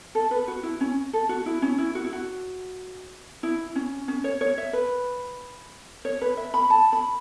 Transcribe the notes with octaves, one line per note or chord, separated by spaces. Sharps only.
A4
B4
F#4
E4
C#4
A4
F#4
E4
C#4
E4
F#4
E4
F#4
E4
C#4
C#4
C#5
C#5
E5
B4
C#5
B4
E5
B5
A5
B5